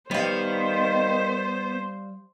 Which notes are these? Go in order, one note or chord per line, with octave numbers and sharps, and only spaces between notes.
D#3 G3 B3 C5 F5